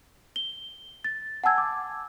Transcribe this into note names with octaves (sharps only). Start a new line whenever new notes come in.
G7
A6
F#5 G#5 A5 E6 G#6
D6